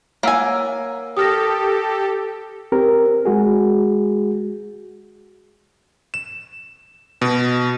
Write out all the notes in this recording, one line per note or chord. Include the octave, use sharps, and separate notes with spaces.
A#3 C#5 F#5 G#5 E6
G4 A4 D#6 F6 A#6
C4 G4 A#4
G#3 F#4 G#4
E7
B2